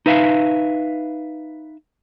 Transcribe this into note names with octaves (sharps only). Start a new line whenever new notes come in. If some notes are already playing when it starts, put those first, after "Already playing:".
D#4 B4 E5 F5